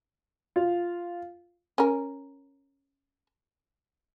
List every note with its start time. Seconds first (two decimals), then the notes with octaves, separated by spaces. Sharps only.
0.56 F4
1.78 C#4 A#4